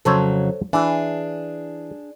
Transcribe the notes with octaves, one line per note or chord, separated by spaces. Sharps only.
F2 C#3 F#3 A4 C5 C#5
E3 D4 G#4